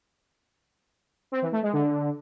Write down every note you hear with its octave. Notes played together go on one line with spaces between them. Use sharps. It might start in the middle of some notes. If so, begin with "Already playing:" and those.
C4
E3
A3
G#3
D3